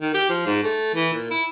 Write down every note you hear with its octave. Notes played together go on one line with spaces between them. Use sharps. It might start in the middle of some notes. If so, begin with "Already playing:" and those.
D#3
G4
F3
G#2
A3
E3
A#2
E4